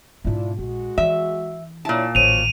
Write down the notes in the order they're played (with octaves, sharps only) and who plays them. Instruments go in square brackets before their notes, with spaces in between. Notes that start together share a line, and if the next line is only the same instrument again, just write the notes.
[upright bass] G#2 B2 [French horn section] D4 E4 F4
[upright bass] A#1 [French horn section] G#3 F#4
[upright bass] E3 [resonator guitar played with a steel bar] E5
[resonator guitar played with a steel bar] A#2 A5 [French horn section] D4 E4 C#5
[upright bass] A1 D#3 [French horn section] F#2 C5 C#5 [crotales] D#7 F7